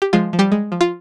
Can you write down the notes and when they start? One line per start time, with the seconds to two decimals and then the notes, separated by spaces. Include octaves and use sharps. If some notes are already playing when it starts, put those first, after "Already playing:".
0.02 G4
0.13 F3 G#3 F4
0.33 F3
0.39 G3 G4
0.52 G#3
0.72 F3
0.81 F4